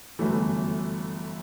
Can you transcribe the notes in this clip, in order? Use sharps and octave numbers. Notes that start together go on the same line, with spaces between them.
G1 F#2 E3 A3